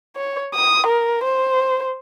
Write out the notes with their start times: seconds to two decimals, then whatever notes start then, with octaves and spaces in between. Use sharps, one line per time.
0.16 C#5
0.55 D#6
0.87 A#4
1.24 C5